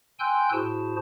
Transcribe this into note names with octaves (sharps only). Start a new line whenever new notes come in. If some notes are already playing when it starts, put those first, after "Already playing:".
G5 G#5 C6 E6 F#6 G6
A2 E4 F#4 G#4 C5 A5